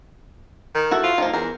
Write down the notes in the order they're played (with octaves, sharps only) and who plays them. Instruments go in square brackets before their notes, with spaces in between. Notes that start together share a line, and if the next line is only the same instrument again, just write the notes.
[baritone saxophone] D#3
[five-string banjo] E4 F#4 A4
[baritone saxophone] F4
[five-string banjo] D#3 F3 A#3
[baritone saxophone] E2 [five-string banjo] A#4